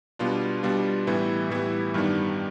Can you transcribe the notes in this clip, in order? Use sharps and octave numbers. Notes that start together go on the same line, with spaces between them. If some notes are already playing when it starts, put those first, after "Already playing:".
B2 G3 B3 D4 F4
B2 G3 B3 D4 F4
A2 E3 G3 B3 E4
A2 E3 G3 B3 E4
G2 D#3 G3 B3 D4